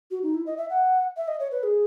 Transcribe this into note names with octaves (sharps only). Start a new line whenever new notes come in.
F#4
D#4
E4
D#5
E5
F#5
E5
D#5
C#5
B4
G#4